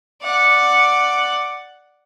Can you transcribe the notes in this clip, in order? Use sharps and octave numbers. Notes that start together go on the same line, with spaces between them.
D5 F#5